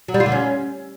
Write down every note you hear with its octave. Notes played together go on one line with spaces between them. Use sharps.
F#3
G3
F4
D3
C#4